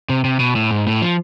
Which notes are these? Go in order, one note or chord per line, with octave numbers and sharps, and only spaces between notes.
C3
C3
B2
A2
G#2
A2
F3